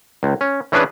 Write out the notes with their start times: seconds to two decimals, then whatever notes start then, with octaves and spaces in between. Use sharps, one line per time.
0.23 C#2
0.41 C#4
0.72 E3 C#4 D4 G#4 B4